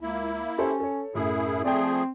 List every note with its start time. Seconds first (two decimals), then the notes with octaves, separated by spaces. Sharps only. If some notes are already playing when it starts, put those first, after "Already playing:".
0.01 C#2 A#3 E4
0.58 C#4 G4 A4 C5
0.80 A4 C#5
1.15 F#2 A2 E4 G#4
1.64 F3 A3 C4 G#4 D5 G5